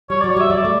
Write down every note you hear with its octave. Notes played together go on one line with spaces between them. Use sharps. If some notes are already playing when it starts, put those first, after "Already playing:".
G3 C#5
F#3 D5
C#5
G3 E5
G3 D5
A3